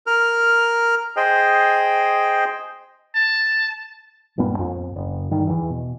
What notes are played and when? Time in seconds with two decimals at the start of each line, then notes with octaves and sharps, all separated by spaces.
0.07 A#4 F6
1.17 G#4 C5 D#5 G5
3.15 A5
4.37 D#1 G2 A#2 B3
4.59 F2
4.96 F#1
5.31 G2 D#3
5.47 E2 E3
5.70 B2